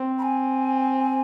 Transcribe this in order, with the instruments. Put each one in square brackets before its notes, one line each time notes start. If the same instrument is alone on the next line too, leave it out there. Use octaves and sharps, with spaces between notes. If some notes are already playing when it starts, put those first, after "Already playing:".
Already playing: [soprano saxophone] C4
[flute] B5
G#5